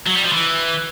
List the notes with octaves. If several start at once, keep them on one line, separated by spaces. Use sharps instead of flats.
F#3
G3
F3
E3